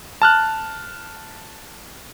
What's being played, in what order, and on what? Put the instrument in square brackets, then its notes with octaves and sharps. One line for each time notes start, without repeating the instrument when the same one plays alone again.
[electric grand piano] A5 F6 F#6